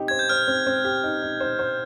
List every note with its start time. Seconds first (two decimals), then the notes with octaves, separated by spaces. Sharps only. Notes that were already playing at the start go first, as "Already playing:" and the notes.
Already playing: C4 D#4 G4
0.08 C5 G#6
0.19 G6
0.29 C5 F6
0.48 C4
0.67 C4
0.85 G4
1.04 D#4
1.22 D#4
1.40 C5
1.59 C5